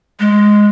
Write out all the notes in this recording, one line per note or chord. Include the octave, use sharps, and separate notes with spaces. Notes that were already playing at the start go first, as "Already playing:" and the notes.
G#3